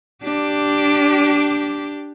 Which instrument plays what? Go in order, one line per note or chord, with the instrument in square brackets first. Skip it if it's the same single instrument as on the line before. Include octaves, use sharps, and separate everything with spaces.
[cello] D4 G4